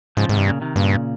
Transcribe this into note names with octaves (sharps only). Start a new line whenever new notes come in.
G#2 C#3 F3
G#2 C3 D#3
G2
A#2 C#3
C3 D#3
G2 A#2 C#3